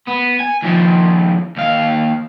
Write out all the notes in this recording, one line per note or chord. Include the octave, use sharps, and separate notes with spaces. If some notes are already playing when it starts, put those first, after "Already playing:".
B3
G#5
D#2 F3
D#2 F5